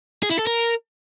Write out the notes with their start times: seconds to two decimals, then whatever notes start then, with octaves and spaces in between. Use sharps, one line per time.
0.23 G#4
0.31 E4
0.39 A4
0.47 A#4